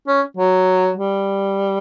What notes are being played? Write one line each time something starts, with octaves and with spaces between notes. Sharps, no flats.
C#4
F#3
G3